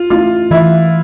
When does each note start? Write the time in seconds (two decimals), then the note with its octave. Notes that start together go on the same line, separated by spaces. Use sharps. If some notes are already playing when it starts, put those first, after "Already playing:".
Already playing: F4
0.10 A3 C#4 E4 F4
0.51 E3 E4